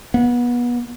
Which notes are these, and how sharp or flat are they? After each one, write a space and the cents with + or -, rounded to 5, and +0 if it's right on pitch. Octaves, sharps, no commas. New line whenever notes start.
B3 -30